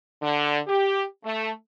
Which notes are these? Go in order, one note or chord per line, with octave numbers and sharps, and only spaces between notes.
D3
G4
A3